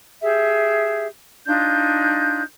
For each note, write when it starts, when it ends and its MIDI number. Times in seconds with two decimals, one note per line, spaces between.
0.20 1.05 67
0.20 1.05 68
0.20 1.05 76
1.46 2.41 62
1.46 2.41 63
1.46 2.41 65
1.46 2.41 91